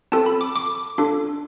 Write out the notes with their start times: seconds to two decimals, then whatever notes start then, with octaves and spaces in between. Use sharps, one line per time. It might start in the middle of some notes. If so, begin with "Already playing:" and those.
0.12 C4 F4 A4 A5
0.26 B5
0.41 D6
0.56 D6
0.98 D4 F4 A4